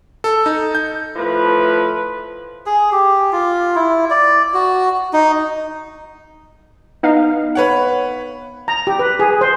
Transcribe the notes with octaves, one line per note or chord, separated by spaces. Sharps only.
A4
D#4
G6
A2 F3 B4
G#4
G4
F4
E4
D5
F#4
D#4
B3 D#4 F5
B4 C#5 F#5
A#5
G4
B4
G#4
C5